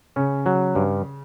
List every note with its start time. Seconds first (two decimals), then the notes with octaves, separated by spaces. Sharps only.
0.16 C#3 C#4
0.46 F#3
0.75 G2